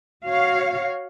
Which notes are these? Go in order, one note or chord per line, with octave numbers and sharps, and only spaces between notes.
F#4 C#5 F5